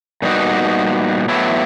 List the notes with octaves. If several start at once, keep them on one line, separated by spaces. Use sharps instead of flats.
A#2 G3 B3 D#4 F#4
A2 F#3 B3 E4